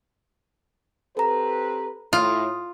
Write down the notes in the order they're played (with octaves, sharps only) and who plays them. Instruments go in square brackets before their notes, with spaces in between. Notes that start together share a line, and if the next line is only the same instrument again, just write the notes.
[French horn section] C4 G4 B4 [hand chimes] A4 A#5
[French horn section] A2 [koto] F4 [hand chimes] D#6